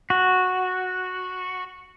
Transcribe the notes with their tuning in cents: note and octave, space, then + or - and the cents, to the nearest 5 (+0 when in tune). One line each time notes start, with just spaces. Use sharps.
F#4 -5